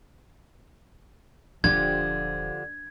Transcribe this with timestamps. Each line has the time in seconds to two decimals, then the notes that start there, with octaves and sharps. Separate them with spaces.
1.64 D#1 D3 F3 D4 G4 G#6